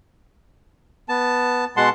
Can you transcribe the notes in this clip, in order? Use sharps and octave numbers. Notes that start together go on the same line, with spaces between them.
B3 A5
B2 G#3 F#5 A5 C6